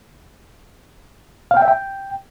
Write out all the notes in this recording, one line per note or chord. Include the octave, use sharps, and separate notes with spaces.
F5
G5
E5
G5